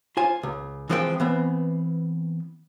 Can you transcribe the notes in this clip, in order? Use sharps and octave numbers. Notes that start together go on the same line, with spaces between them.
F4 C5 G#5
C#2
E3 F3 G#3 C4 A#4 G5
E3 B3 C4